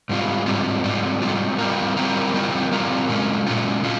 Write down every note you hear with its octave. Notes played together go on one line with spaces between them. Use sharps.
G#2 G3 C4 F4
G#2 G3 C4 F4
G#2 G3 C4 F4
G#2 G3 C4 F4
G3 C4 F4 A#4
G3 C4 F4 A#4
G3 C4 F4 A#4
G3 C4 F4 A#4
A#2 G#3 C#4 F4
A#2 G#3 C#4 F4
C#4 F4